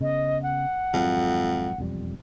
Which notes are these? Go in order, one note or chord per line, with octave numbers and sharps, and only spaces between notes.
C#3 B3 D#5
F#5
G#1 F2 F#3 G#3
E1 F2 G3